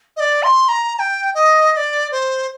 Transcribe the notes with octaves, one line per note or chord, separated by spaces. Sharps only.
D#5
D5
C6
A#5
A#5
G5
D#5
D#5
D5
C5